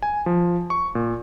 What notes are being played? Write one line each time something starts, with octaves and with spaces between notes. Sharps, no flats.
G#5
F3
C#6
A#2